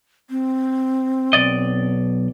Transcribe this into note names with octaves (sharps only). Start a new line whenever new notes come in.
C4
B1 D5 D#5